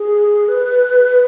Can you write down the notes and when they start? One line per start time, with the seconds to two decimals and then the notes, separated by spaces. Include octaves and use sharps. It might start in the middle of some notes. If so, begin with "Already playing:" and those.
Already playing: G#4
0.48 B4